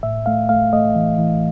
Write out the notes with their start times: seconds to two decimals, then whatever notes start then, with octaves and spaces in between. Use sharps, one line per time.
0.03 A2 E5
0.26 A3 F5
0.49 A3 F5
0.73 A3 D#5
0.95 E3
1.18 E3